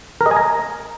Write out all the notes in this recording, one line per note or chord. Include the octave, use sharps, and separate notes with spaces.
A#4
D#5
G#5
A#5